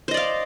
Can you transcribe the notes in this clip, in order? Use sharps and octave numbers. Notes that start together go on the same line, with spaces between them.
C5 D5 D#5 F5